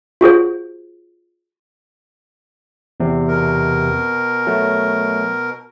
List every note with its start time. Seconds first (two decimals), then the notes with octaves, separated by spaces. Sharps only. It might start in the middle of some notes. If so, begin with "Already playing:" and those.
0.21 F4 F#4 G#4 C5
3.00 E2 C3
3.28 B2 A#4
4.47 F#3 A3